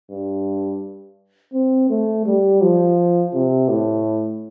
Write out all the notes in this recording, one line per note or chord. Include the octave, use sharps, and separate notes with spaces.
G2
C4
A3
G3
F3
C3
A2